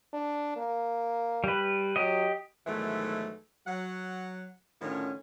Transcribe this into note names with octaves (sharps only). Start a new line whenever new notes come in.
D4
A#3
G3 B4
F#3 G4 D#5
G#2 B2 D#3 E3 F#3 A3
F#3 F#5
A2 D3 D#3 F3 C#4